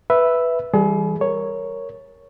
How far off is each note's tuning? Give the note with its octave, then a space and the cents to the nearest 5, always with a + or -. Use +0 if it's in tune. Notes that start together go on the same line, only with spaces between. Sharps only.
B4 +0 E5 +0 E6 +0
E3 +0 G3 +10 G#4 +40
A#4 +0 C#5 +0